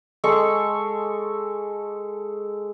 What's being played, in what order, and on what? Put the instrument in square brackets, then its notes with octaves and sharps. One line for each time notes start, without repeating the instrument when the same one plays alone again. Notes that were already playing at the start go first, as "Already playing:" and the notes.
[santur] G#3 A4 C#6